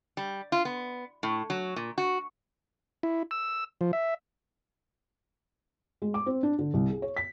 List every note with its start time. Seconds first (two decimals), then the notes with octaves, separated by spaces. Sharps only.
0.17 G3
0.52 F4
0.65 B3
1.23 A2
1.50 F#3
1.76 A#2
1.98 F#4
3.03 E4
3.31 E6
3.81 F3
3.93 E5
6.02 G#3
6.14 D6
6.26 C4
6.43 D4
6.59 D3
6.74 C2
6.90 G#4
7.02 C#5
7.17 B6